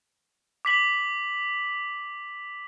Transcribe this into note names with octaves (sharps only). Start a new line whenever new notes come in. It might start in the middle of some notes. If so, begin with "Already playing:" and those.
D6 B6 F#7